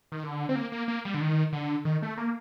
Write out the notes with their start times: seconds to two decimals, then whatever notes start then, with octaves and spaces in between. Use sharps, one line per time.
0.12 D#3
0.23 D3
0.49 C4
0.56 A#3
0.72 A#3
0.88 A#3
1.05 G3
1.14 D3
1.21 D#3
1.53 D3
1.85 D#3
2.02 A3
2.17 A#3